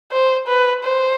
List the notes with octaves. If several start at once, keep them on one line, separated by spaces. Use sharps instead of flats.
C5
B4
C5